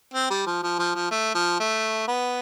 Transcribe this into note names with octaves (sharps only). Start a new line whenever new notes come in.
C4
G3
F3
F3
F3
F3
A3
F3
A3
B3